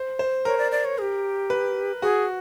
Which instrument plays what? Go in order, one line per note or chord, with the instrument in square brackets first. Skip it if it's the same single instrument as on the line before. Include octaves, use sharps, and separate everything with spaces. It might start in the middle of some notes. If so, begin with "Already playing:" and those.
Already playing: [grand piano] C5
C5
[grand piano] A#4 [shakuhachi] C#5
[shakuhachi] D5
D5
C#5
G#4
G4
[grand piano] B4
[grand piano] F#4 [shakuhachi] G#4